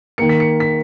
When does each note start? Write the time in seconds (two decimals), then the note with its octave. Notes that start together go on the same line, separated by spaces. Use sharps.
0.18 D#3 A#3 C#7
0.29 B6
0.40 C#7
0.60 B6